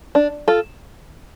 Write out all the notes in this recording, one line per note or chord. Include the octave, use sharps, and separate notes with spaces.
D4
F4 A4